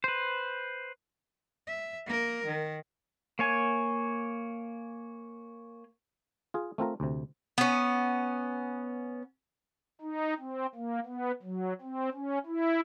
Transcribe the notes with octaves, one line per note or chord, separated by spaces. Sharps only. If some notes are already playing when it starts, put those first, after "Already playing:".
B4 C5
E5
A#3 A#4
D#3
A#3 C#5 G#5
F4 G#4
A3 C4 F4 A#4
D2 C3
B3 C#4
D#4
C4
A#3
B3
F#3
C4
C#4
E4